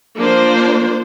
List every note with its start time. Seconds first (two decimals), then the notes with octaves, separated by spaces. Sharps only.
0.19 F3 A#3 D4 C5